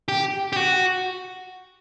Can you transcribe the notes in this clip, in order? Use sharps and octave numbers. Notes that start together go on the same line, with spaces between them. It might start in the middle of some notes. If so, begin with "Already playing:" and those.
G4
G4
F#4